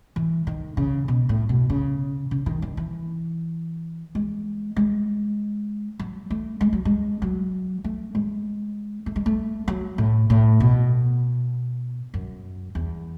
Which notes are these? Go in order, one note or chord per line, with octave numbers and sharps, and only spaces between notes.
E3
D#3
C#3
B2
A2
B2
C#3
C#3
D#3
D#3
E3
G#3
G#3
F#3
A3
G#3
F#3
G#3
F#3
A3
G#3
A3
G#3
A3
F#3
A2
A2
B2
F#2
E2